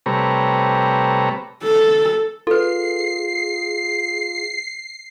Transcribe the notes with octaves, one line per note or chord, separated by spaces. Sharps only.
C3 G3 A3 B4 C#5 A#5
A4
F4 G#4 A4 B4 C7